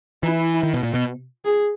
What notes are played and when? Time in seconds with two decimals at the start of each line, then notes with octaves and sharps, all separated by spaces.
0.23 E3 E4
0.63 D#3
0.74 B2
0.83 A#2
0.94 B2
1.45 G#4